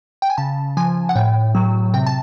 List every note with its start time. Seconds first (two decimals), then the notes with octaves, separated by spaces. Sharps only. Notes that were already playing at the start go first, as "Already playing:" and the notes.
0.22 G5
0.30 G#5
0.38 C#3 A5
0.77 F3 G#5
1.09 F#5
1.16 A2 G5
1.55 F#3
1.94 C3 G5
2.06 A5